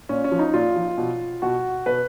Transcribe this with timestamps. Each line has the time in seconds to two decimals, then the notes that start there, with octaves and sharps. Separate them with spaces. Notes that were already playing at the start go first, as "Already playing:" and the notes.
0.09 A#2 C#4
0.24 C#4
0.32 F3
0.39 D#4
0.54 A#2 F4
0.76 F3
0.98 B2
1.42 B2 F#4
1.86 B2 B4